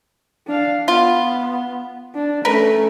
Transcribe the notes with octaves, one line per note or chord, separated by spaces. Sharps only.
D4 F5
B3 F4
D4
A3 C#4 A#4 B4